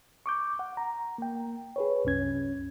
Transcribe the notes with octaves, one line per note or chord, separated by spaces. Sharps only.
C#6 D6 G6
F#5
A#5
A#3 G5
G#4 B4 C#5
C2 F#2 C#4 G#6